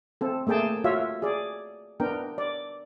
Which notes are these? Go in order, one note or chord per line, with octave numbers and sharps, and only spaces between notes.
C4 A4
A3 A#3 G#4 G5 A5
F4 F#4 C#5 E5 F5
G#4 D5
B3 D4 A#4 G5
D5